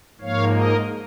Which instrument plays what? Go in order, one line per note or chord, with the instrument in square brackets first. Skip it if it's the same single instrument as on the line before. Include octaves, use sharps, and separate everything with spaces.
[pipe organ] G#2 F3 A#3 C#5 F5
A#4 D#5